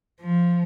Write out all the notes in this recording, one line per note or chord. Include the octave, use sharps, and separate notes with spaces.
F3